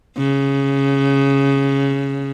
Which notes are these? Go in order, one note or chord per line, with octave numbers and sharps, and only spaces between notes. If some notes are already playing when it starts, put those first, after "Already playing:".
C#3